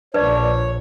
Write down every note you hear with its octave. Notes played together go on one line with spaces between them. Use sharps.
A#1 D4 B4 C#5 D5